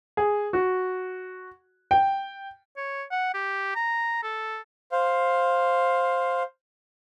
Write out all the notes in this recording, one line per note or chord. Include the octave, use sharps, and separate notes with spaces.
G#4
F#4
G5
C#5
F#5
G4
A#5
A4
C5 F5